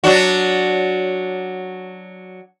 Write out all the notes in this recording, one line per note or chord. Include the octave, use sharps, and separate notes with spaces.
F#3 D4 F#4